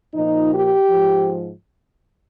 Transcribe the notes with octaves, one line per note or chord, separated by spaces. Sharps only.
A#2 F3 D#4
G4
G#2 F3